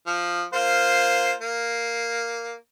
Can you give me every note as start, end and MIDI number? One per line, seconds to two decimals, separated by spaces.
0.07 0.43 53
0.53 1.33 58
0.53 1.33 65
0.53 1.33 72
1.41 2.54 58